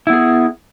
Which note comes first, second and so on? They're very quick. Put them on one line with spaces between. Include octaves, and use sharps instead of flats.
E4 B3 G#4